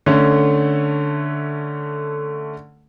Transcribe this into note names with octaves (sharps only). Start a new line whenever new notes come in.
D3 A3 C#4